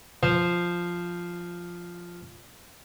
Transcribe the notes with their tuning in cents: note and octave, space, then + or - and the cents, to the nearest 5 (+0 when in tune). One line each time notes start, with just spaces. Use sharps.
F3 +0 C5 +0